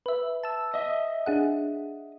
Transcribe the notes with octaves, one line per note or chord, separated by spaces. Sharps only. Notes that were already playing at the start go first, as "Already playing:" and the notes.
B4 E5
A5 E6
D#5 E5
D4 G#4 F#5